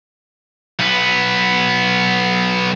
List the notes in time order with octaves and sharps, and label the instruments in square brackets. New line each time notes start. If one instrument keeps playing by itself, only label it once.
[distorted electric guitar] B1 B3